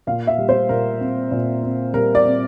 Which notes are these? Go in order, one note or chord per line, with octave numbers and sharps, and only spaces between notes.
A#2 F5
E5
G3
C5
A#2 A#4
C4
A#2
C4
G3 A#4
D5
C4